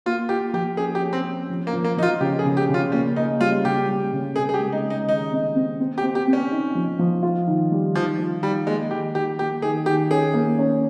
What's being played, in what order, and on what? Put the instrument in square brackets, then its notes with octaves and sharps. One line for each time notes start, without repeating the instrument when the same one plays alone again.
[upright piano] A#3 [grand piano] F4
[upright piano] F4 [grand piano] G4
[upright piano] F3 [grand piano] G4
[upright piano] C#4 [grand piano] G#4
[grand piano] G4
[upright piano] C#4
[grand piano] C4
[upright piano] C#4
F3
[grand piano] A#3
[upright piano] F3
[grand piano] A#3
[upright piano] F3 [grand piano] D#4
[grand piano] F4
[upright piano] C#3 [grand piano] G4
[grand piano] G#4
[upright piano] C#3
[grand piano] G4
[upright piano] C#3 [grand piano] F4
[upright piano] A#3 [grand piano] C#4
[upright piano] A#3 [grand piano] D#4
[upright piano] G3 [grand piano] F4
[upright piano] C#3 [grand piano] G4
[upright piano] G3
C#3
[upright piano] C3 [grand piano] G#4
[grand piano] G#4
G4
[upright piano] G#3
[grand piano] D#4
[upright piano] G#3
[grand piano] D#4
[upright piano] D#3 [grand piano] D#4
[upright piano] C4
C4
C4
[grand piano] G4
[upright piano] C4
[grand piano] G4
[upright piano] C4
[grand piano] C#4
[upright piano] D#4
F3
F3
F4
D#3
G3
[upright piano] D#3 [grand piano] F3
[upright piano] F4
[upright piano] D#3 [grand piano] G3
[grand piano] G#3 [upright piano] A#3
[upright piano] D#3 [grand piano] G4
[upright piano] D#3 [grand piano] G4
[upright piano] A#3 [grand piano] G4
[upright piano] D#3 [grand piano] G#4
[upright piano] D#3 [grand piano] G4
[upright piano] C#4 [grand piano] G#4
[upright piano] A#3
C#4